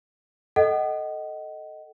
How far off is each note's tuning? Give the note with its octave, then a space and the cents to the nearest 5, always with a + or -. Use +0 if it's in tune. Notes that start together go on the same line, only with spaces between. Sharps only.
A4 +0 D#5 +0 F#5 +35